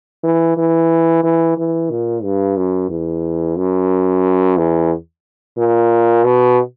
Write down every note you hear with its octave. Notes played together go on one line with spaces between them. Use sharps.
E3
E3
E3
E3
A#2
G2
F#2
E2
F#2
E2
A#2
B2